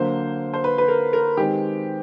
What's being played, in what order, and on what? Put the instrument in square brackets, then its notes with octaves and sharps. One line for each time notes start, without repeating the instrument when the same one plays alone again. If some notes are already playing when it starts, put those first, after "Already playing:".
Already playing: [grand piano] D3 F#3 A#3 [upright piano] C5
[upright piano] C5
B4
B4
A#4
A#4
[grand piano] D#3 G#3 C4 [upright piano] G4